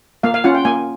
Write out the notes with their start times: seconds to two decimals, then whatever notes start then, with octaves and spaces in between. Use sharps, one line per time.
0.23 A#3 F5
0.34 F5
0.44 C#4 F4 F#5
0.55 G5
0.65 A#3 G#5